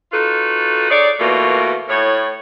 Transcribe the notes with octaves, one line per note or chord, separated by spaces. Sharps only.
D#4 F4 F#4 A4 B4
D#4 G#4 C#5 D5
B2 E3 A3 A#3 F4
A2 C#5